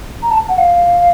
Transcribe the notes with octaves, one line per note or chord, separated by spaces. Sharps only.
A#5
A5
F#5
F5